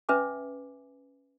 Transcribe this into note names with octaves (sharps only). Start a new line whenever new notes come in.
C#4 B4 E5 G#5 D6